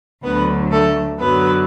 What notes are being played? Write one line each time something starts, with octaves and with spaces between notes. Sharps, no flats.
D2 D3 F#3 B3 B4
A3 A4
F#2 D3 F#3 B3 B4